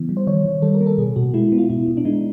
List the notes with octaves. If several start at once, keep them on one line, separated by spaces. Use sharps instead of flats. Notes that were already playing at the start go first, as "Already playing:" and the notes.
Already playing: C#3 E3 B3
G3
C5
D#3 C#5
D#3
G3 A4
A#4
A#3
A4
B2 G#4
B2 F#4
G#3 E4
B3
F4
B2 E4
B2
D4
G#3 D#4